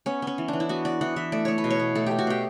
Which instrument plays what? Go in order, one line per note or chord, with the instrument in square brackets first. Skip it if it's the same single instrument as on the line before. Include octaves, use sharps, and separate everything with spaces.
[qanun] B3 C#4
B3 C#4
E3
E3 D4
E4
B3 F#4
B3 D5
E3 F#5
E3 E5
A3 D5
A3 C#5
B4
B2
C#5
B2
A3 A4
A3 G4
F#4
B2 G4